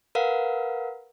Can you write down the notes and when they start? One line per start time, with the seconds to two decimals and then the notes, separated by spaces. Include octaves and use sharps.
0.15 A#4 B4 F5 F#5